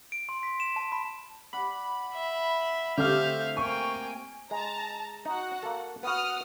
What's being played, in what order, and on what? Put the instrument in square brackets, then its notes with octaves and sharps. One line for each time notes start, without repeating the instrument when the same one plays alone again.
[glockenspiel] D7
C6
B6
E7
A5
B5
[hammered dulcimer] D5 F#5 [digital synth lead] B5
[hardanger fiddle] E5
[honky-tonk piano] D3 F6 [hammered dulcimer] A3 C4 G4 [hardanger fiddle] E5 F5 [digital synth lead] G6
[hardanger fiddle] A#3 G5 [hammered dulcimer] C5 [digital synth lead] G#5 [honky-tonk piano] C#6
[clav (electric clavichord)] G#3 [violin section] A5 A#5
[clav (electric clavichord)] D#4 [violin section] F#4 F#5
[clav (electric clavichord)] A#3 A4
[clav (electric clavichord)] B3 F#4 [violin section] F#5 D#6 F6